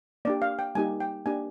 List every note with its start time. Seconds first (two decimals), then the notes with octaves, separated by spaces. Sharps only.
0.25 A#3 D4 G4 D5
0.42 F5
0.59 G5
0.75 G3 A#3 D#4 G4 G#5
1.00 G5
1.26 A#3 D4 G4 G#5